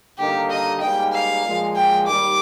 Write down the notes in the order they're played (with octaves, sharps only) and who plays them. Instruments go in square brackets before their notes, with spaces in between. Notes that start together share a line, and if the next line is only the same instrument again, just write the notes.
[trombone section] D#2 D3 G3 A#3 D#4 [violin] G4
[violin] D#5
[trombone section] G#2 G3 A#3 [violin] G5
[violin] F5
[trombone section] A#2 F3 G#3
[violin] G5
[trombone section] D#2 D#3 G3 [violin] D6